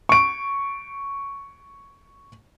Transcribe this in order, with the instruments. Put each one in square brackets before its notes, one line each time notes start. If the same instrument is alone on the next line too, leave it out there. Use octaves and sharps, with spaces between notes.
[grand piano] C#6 D7